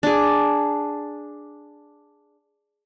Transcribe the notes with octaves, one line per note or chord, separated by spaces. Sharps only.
D4 G#4